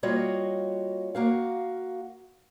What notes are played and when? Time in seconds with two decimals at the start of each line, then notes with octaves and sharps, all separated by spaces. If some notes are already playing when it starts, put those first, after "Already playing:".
0.03 G3 A#3 F4 F#4 C#5 D#5
1.15 A#3 F#4 F5